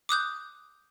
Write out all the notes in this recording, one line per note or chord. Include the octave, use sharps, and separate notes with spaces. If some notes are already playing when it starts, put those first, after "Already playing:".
D6 D#6 F#6 G6